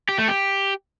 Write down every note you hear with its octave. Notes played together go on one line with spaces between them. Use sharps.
G4
A3
G4